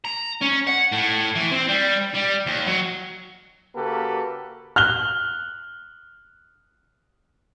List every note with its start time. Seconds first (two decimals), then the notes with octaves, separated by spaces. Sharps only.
0.05 A#5
0.41 C#4
0.67 F#5
0.92 A2
1.35 E3
1.51 C4
1.68 G3
2.14 G3
2.46 D#2
2.66 F#3
3.76 C#3 A#3 F#4 G4 A4 B4
4.76 F6 F#6 G7